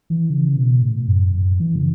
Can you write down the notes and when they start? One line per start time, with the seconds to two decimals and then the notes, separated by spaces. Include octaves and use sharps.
0.10 E3
0.30 C#3
0.56 B2
0.82 A2
1.08 F#2
1.34 F#2
1.60 E3
1.76 C#3